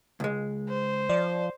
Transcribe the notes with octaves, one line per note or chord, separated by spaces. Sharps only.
C#2 G#3
C5
F3 D5